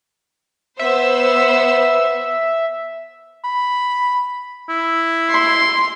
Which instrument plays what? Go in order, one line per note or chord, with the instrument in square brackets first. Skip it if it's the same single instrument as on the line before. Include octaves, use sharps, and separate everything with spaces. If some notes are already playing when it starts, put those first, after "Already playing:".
[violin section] B3 C5 E6 [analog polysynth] E5
[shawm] B5
E4
[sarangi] C6